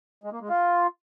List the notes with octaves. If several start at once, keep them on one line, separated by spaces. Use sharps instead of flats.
G#3
A#3
G#3
F4